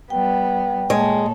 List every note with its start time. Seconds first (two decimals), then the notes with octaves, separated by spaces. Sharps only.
0.10 G3 B3 G5
0.90 A#2 G#3 A4 C#5